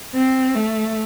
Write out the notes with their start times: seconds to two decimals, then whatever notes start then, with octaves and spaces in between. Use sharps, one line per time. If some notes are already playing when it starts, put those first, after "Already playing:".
0.14 C4
0.55 A3